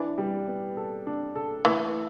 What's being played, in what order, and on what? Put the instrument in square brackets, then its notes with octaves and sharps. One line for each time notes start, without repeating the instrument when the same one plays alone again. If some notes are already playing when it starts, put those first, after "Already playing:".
Already playing: [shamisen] E3 [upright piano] D4
[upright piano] G3
B3
A4
D4
A4
[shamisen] E3 [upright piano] A3